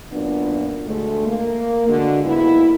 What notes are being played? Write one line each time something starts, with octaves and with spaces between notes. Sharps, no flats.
F#2 A#2 B3 D4
D2 G#3 A3
A#3
D3 G#3 F#4
G#2 A#3 B3 E4